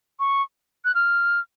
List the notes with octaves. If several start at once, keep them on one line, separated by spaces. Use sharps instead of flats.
C#6
F#6
F6